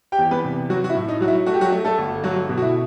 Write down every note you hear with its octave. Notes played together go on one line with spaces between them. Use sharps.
G4 G5
E2
B3 B4
C3
F#3 F#4
F#4
E4
A2
D#4
F#3 F#4
E4
A3 F#4
G4
F#3 F#4
A3
A3 A4
G1
F#3 A3 F#4
B2
F#4
E4